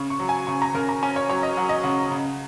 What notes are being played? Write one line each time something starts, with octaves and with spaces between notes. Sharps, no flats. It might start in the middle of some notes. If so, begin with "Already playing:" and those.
Already playing: C#3 C#6
C#6
F#3
G#5
C#3 C#6
A#5
C#3 A#4
A#5
C#4 G#5
C#5
F#3 C#5
D#5
F#3 F#5
D#5
C#3 F#5
C#3